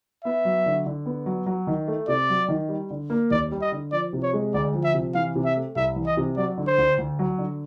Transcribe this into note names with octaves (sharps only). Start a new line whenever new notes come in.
B3 E5
F#3
D3
D3
B3
F#3
F#3
D#3
A3
C3 D5
F#3
D#3
G3
D3
A#3
D#2 D5
G3
D#5
D3
F3 D5
C3
C#5
G#3
D2 D5
F3
E5
C3
E3 F5
C3
E5
A3
C2 E5
E3
D#5
C3
F#3 D5
D3
C5
D2
D2
F#3
D3